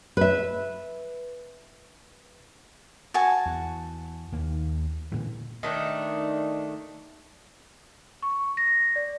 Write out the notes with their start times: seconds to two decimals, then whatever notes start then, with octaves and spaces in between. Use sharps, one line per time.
0.17 B4 E5
3.14 F#4 G#5 A5
3.46 E2
4.32 D#2 A#3
5.12 A#2 D3 E3
5.63 D#3 A3 D4
8.23 C#6
8.57 A#6
8.96 D5